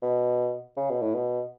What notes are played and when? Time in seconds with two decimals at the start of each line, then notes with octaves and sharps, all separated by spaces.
0.02 B2
0.77 C#3
0.90 B2
1.02 A2
1.14 B2